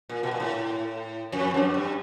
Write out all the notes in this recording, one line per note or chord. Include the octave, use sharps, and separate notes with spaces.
A#2
B2
A#2
A2
F2
F#2
G2